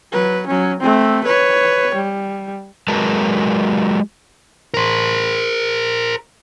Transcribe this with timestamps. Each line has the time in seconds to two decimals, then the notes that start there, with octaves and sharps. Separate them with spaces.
0.13 F#3 B4
0.48 F#3 C#4
0.80 A3 C4
1.25 B4 C#5
1.95 G3
2.88 F#3 G#3 A#4 B4 A5
4.74 A#4 C5